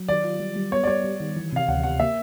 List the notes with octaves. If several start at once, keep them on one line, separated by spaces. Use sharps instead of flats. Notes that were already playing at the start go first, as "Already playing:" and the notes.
Already playing: F#3
D#3 D5
F4
G3
G3
B3 C#5
D5
G3 C#5
G3
D#3
E3
C3 F5
D2 F#5
C3 F#5
A#3 E5